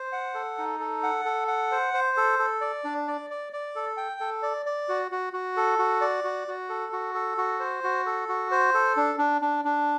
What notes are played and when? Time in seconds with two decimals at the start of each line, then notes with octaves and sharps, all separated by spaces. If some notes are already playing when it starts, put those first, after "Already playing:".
Already playing: C5
0.12 F#5
0.34 A4
0.58 D#4
0.80 A4
1.03 F#5
1.25 A4
1.48 F#5
1.71 C5
1.94 C5
2.17 A4
2.39 A4
2.61 D5
2.84 D4
3.08 D5
3.30 D5
3.53 D5
3.75 A4
3.97 G5
4.20 A4
4.42 D5
4.66 D5
4.89 F#4
5.11 F#4
5.33 F#4
5.57 A4
5.79 F#4
6.01 D5
6.24 F#4
6.48 F#4
6.69 A4
6.92 F#4
7.14 A4
7.38 F#4
7.60 C5
7.84 F#4
8.06 A4
8.28 F#4
8.51 C5
8.74 A4
8.97 D4
9.18 D4
9.41 D4
9.65 D4